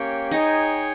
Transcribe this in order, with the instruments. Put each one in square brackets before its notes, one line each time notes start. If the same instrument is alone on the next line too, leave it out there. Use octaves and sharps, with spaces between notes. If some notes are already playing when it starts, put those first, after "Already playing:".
Already playing: [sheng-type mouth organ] A#3 C#4 G4 C#5 G5
[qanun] D#4 [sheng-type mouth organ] G#4 C#5 G5